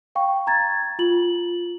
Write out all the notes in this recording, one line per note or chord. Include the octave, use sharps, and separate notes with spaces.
F5 G5 C#6
A#5 G#6 A6
F4 F#7